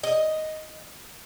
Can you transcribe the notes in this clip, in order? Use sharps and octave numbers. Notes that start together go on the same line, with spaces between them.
D#5